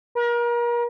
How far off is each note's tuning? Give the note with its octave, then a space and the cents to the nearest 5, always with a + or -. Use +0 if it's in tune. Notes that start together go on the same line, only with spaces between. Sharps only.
A#4 +35